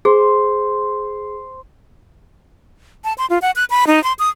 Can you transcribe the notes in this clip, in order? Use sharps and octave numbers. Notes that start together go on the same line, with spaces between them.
G#4 C5
A5
C6
F4
F#5
F#6
B5
D#4
C6
D#6